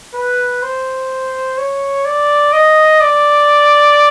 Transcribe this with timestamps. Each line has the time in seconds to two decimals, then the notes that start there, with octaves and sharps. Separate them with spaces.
0.15 B4
0.62 C5
1.58 C#5
2.05 D5
2.53 D#5
3.01 D5